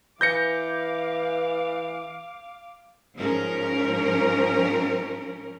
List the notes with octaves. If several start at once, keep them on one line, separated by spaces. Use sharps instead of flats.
E3 F5 D6 G6 A#6 C#7
G#2 F3 C#4 A#4